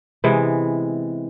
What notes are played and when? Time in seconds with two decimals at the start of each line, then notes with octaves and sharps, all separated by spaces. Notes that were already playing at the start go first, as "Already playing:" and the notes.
0.24 C3 E3 G#3 B3